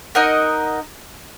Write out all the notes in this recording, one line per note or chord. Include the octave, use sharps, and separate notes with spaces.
D#4 A#4 D#5 F#5